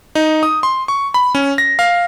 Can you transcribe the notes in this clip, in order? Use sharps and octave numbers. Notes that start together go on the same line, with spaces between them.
D#4
D#6
C6
C#6
B5
C#4
A#6
F5